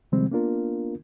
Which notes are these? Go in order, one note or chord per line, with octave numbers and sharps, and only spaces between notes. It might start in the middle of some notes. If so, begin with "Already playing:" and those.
C3 D#3 F3 G3 G#3 C4
A#3 B3 D4 F4 A#4